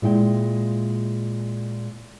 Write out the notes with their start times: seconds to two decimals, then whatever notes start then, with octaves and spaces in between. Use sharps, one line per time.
0.02 A#2 G#3 E4 G5